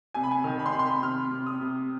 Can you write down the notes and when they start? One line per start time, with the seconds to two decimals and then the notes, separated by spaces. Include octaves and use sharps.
0.14 C3 G#5
0.23 B5
0.31 G#5
0.44 D#3
0.59 B5
0.66 C6
0.72 C3 B5
0.79 C6
0.87 B5
1.02 C3 F6
1.31 C3
1.46 D#6
1.61 C3